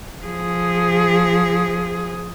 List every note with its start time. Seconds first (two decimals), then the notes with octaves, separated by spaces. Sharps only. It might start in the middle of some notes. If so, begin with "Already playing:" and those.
0.23 F3 G#4